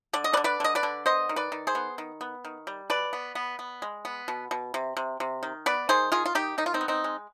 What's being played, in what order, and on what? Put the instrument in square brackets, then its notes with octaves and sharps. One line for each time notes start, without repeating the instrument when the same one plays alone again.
[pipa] D3 D5
D#5
B4 D5
D3
B4 D5
D3 D#5
B4 D5
D3
B3 C5 D#5
D#3
B4 D5
D#3
G#4 C5
B3
D#3
B3
D#3
G3
B2 B4 D5
B3
B3
B3
G#3
B3
B2
B2
C3
C3
C3
D#3
B3 B4 D5
D#3 G#4 C5
D#3 F4 G#4
F4
D#3 D#4 G4
D#3 D#4
F4
C4 D#4
B3
C4 D#4
G#3